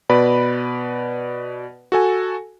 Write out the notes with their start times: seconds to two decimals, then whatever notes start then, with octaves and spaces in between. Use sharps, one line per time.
0.09 B2 B4 D5 B5
1.92 F#4 A4 G#5